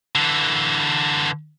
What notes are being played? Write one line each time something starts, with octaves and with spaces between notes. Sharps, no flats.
D3 E3